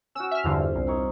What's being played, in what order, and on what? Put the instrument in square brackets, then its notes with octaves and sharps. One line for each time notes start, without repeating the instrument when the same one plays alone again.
[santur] C#4 F#4 [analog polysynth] E6
[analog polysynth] E5 F6
[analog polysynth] E2 G2 D3 [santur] F4 C5
[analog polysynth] C2
[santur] C4 D#4 C#5